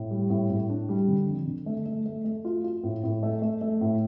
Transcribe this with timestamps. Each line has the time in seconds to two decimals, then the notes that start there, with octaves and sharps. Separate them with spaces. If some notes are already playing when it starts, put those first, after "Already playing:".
Already playing: A2
0.11 G3
0.30 A2
0.50 A2
0.69 D4
0.89 G3
1.08 D3
1.27 F2
1.47 D3
1.66 A3
1.86 A3
2.06 A3
2.25 A3
2.45 F4
2.64 F4
2.84 A2
3.03 A2
3.23 A3
3.42 A3
3.61 A3
3.81 A2